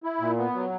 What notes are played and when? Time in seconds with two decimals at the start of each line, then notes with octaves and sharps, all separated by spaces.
0.03 E4
0.20 A#2
0.38 B3
0.55 F#3